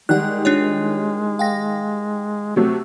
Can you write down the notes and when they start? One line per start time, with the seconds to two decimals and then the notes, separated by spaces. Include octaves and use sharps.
0.09 D#3 G3 G#3 F#5 F#6
0.45 D4 F4 C#5
1.39 F5 G5 A#6
2.56 C3 F#3 A3 F#4